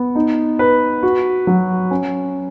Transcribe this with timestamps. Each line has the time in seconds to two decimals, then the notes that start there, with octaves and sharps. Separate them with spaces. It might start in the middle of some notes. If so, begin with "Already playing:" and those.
Already playing: B3
0.15 D#4
0.59 B4
1.03 F#4
1.47 F#3
1.91 C#4